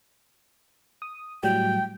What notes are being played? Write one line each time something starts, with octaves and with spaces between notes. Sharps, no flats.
D#6
A2 F#3 G3 G5